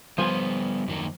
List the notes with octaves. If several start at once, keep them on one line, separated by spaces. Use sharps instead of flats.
F3 G3 B3 G#5
F#2 D#3 A#3